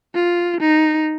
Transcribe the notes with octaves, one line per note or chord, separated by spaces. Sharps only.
F4
D#4